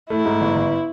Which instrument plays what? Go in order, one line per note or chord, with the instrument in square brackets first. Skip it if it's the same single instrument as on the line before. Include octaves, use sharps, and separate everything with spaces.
[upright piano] A3 [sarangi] E4
[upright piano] G#2
G1
G1